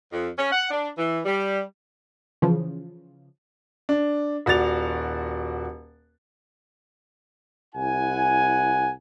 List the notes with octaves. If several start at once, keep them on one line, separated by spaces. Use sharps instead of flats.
F2
C#4
F#5
D4
E3
G3
C#3 E3 F3
D4
D#1 F#4 D5 A6 F7
C2 E4 F#5 G#5